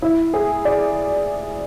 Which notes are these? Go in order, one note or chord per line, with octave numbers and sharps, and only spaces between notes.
E4
G#4
D5